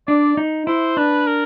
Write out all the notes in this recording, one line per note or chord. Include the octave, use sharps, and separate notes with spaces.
D4 D5
D#4
E4 C5
D4 B4
A#4